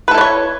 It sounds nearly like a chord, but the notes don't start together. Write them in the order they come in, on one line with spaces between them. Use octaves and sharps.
B4 A4 E4 D5 C#5